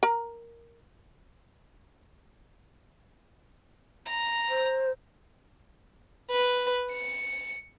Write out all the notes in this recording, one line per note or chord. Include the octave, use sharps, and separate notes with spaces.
A#4 A#5
A#5
C5
B4
C#7